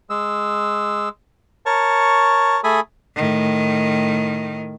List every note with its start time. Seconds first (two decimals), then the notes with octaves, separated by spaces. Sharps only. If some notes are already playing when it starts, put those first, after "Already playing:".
0.10 G#3 E6
1.66 A#4 C#5 A5 C#6
2.64 A3 G#4 A4 G#5 B5 D#6
3.16 A2 D#3